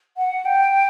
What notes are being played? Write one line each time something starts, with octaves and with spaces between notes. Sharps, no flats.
F#5
G5